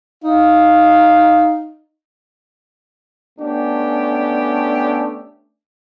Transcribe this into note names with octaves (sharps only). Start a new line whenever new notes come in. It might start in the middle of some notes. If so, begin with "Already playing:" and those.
D#4 F5
A3 B3 C#4 D4 G4